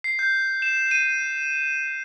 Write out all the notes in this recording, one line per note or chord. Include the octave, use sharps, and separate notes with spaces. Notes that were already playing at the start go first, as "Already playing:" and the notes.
C7
G6
E7
D#7